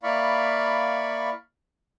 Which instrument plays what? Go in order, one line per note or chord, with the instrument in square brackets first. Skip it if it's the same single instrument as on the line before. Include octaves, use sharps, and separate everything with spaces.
[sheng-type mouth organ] A#3 E4 D5 F5 B5 C#6